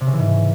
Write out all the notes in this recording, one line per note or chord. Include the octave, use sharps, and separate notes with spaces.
C3
C#3
E3
G#2